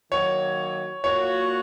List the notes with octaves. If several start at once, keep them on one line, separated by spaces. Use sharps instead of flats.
D#3 F#3 A#3 C#5
A#2 A#3 F#4 C#5